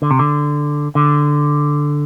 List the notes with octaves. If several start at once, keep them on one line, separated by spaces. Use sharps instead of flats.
D3
C3
D3
D3